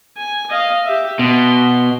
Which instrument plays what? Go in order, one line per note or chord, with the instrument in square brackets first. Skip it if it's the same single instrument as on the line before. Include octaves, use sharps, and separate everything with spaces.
[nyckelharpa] G#5
D#5 F5
G4 E5
[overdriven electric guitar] B2 [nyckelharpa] C6